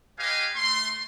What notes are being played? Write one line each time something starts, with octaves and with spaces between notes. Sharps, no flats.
G4 B4 D#5 F5 G#5
A3 C6